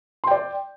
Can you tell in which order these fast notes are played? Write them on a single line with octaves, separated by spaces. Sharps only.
C6 G5 D5